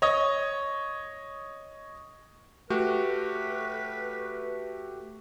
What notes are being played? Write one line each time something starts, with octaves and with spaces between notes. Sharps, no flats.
C#5 D#5 D#6
A3 F#4 G4 B4